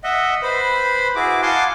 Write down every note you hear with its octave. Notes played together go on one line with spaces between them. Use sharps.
D#5 E5 F#5
B4 C5 B5
E4 F#4 G#4 D6
F5 F#5 G#5 A5 C6 D6